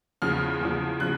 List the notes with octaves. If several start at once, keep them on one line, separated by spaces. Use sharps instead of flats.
E2 C#3 F3 F6
E2 C#3 F3
C#3 F3 F#6